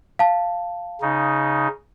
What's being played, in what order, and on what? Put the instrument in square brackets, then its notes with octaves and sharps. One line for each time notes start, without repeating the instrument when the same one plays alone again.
[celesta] F5 A5
[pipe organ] C#3 D#4